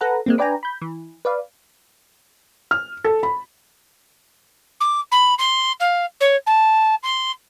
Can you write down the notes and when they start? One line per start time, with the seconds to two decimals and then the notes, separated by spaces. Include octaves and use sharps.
0.01 A4 B4 F#5 A#5
0.26 G#3 A#3 C4
0.38 D4 B4 D5 G5 G#5 A#5
0.63 B5 G6
0.82 E3
1.25 B4 D5 F5
2.71 F6
3.04 A4
3.23 B5
4.80 D6
5.11 B5
5.38 C6
5.80 F5
6.20 C#5
6.46 A5
7.03 C6